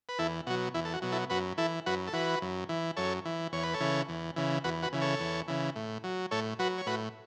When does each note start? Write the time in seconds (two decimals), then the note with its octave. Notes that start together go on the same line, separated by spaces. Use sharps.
0.09 B4
0.19 E2 E4 A4
0.47 B2 F#3 F#4
0.74 E2 E4
0.85 A4
0.94 F#4
1.02 B2 F#3
1.12 E4 A4
1.30 F#2 F#4 B4
1.57 E3 E4 A4
1.86 F#2 F#4 B4
2.07 A4
2.13 E3 F#4 B4
2.42 F#2
2.69 E3
2.97 F#2 A4 C#5
3.25 E3
3.53 E2 C#5
3.63 B4
3.74 A4 C#5
3.80 C#3 E3
4.09 E2
4.36 C#3 E3
4.64 E2 F#4 B4
4.83 F#4 B4
4.93 C#3 E3
5.02 A4 C#5
5.20 E2
5.48 C#3 E3
5.76 A2
6.04 F#3
6.31 A2 A4 C#5
6.59 F#3 F#4 B4
6.78 C#5
6.86 A2 F#4 B4